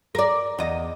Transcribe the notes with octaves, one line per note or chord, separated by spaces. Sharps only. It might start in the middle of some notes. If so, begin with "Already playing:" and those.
A#4 D5
E2 D#5